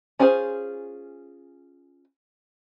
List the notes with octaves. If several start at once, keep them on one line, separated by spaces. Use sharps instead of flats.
C#4 D4 F4 G#4 C5